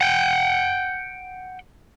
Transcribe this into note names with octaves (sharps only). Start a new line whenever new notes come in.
F#5 G5